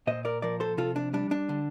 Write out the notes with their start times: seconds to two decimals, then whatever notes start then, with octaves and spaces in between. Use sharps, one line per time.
0.07 A#2 C5 D#5
0.25 A#4 D5
0.42 F3 A#4 D5
0.60 A4 C5
0.77 C3 F4 A4
0.96 D4
1.13 G3 D4
1.31 D4
1.49 D3